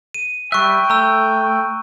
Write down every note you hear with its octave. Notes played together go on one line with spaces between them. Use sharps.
D#7
G3 E5 G5 C#6 F#6
A3 A#5 E6